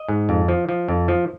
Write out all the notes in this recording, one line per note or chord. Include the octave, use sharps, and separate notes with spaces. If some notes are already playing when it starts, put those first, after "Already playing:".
Already playing: D#5
G#2
F2
F3
F3
F2
F3